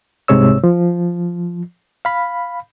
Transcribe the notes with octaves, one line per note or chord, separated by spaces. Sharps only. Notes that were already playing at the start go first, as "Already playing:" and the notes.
C2 G#2 C3 G#3 C#5 E6
F3
F5 B5